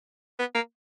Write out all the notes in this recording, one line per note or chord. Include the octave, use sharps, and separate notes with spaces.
B3
A#3